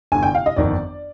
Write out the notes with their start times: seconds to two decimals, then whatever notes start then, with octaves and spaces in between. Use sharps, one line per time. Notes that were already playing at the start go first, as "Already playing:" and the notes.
0.12 G1 G2 D3 G#5
0.23 G5
0.35 F5
0.46 D#5
0.56 G1 F2 D#3 D5